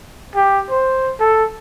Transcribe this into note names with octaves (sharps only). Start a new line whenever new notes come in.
G4
C5
A4